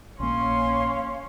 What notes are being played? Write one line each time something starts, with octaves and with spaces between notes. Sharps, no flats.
A#1 A#3 C#4 C#5 F5 C6